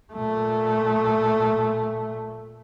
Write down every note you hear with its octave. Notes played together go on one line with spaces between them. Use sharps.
A#2 A3